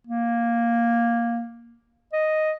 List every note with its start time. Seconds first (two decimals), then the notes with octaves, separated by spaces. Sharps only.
0.07 A#3
2.13 D#5